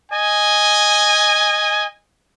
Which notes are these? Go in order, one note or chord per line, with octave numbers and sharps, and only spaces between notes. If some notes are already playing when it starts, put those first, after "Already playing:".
D#5 G#5